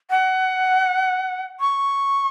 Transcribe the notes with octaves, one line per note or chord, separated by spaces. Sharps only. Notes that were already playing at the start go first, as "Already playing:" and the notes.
F#5
C#6